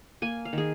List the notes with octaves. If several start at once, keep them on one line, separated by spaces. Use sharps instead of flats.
A#3 G#5
F5
D#3 G#4